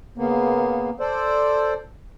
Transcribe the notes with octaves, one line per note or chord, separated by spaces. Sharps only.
C#3 A#3 B3
A4 C5 D5